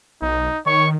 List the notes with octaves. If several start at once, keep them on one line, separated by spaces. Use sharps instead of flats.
B1 D#4
D#3 C#5 C#6